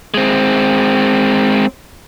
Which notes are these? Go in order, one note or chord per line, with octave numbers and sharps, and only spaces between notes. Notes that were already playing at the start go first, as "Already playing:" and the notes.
G#3 C4